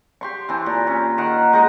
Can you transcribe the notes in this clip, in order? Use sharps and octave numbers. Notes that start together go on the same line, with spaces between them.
G4 C6 C#6
E3 C4 A5
A#2
C#4
D#3 F#5
G#3 D#4 F#4 D#5